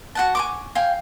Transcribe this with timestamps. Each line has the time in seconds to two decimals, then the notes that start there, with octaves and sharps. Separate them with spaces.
0.15 F#4 F#5 A5
0.35 G#5 C#6 D6
0.75 F5 G5 G#5